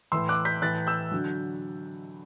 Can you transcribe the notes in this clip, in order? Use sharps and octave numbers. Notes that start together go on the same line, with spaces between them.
A2 E3 C6 E6
D6 F#6
G6 B6
A2 E3 F#6 A6
E6 G6
D3 F#3